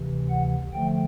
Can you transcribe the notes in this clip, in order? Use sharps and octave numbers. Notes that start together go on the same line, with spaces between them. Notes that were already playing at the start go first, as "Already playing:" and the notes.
Already playing: D2 C3 E3
F#5
D3 F3 A3 G5